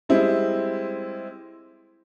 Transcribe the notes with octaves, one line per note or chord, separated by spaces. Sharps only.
G3 G#3 C4 E4